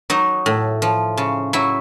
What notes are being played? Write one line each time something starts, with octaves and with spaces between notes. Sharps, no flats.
F#3 D#4
A2
F3
C#3
F#3 E4